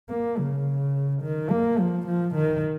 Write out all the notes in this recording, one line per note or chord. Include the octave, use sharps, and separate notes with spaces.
A#3
C#3
D#3
A#3
F3
F3
D#3